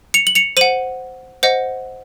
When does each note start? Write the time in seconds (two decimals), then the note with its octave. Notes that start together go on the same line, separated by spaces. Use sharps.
0.14 C#7 F7
0.27 F#7
0.35 C#7 F7
0.57 C5 F#5 D#7 F#7
1.43 C5 D#5 F#5